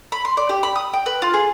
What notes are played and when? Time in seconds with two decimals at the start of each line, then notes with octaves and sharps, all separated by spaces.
0.12 B5
0.25 C6
0.37 D5
0.49 G4
0.63 B5
0.76 D#6
0.94 G5
1.06 B4
1.22 F4
1.34 G#4